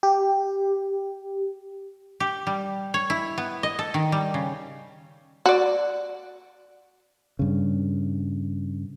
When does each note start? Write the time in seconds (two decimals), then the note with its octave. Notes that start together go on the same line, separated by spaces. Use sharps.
0.03 G4
2.20 G4
2.47 G3
2.94 C#5
3.10 E4
3.38 B3
3.63 D#5
3.79 A4
3.94 D#3
4.12 G3
4.34 C#3
5.46 F#4 D5
7.39 G2 C#3